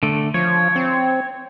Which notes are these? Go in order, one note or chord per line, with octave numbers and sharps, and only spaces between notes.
D3 A3
F3 C#5
C4